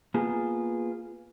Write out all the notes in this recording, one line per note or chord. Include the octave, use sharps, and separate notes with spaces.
A#3 B3 F4 G#4